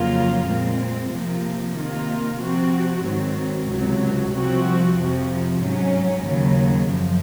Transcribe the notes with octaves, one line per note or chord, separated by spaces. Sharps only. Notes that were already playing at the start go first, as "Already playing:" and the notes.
Already playing: F2 C#3 F#3 A#3 F4
A#2 G#3 C4
C3 F3 A#3
C3 D#3 A#3 F4
C3 F3 C4 F#4
G#2 D#3 F#3 C4
C#2 C3 F#3
C2 C3 F3 C4 F#4
F2 C3 F3
G#2 F#3 C#4
D#2 C#3 F#3
F#2 F3